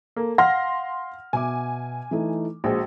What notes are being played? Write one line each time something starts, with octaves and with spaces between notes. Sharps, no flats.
A#3 A4
F5 F#5 C6 F6 A#6
B2 E5 G#5 D6
E3 A3 D#4
A#1 G#3 F#4 C5